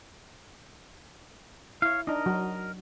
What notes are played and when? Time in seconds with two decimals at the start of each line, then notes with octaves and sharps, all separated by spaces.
1.82 E4 C#5 F5
2.07 D4 D#4 A#4 D#5
2.26 F#3 F#4